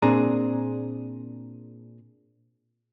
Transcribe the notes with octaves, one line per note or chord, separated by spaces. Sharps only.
A#2 C4 D4 G#4 A#5